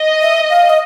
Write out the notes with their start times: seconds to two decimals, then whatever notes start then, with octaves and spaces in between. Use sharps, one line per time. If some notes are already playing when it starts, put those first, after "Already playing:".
Already playing: D#5
0.22 E5
0.50 F5
0.70 D#5